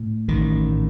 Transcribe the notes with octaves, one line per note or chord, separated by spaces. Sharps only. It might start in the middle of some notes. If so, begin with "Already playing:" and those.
Already playing: A2
A1 D#3
A2